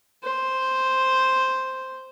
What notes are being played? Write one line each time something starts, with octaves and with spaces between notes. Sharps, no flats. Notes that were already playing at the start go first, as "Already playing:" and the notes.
C5